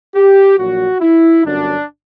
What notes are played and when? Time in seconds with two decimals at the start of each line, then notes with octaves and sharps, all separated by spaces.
0.15 G4
0.58 A#1 A#2 F#3 F#4
1.01 E4
1.45 G1 F#2 D3 F#3 D4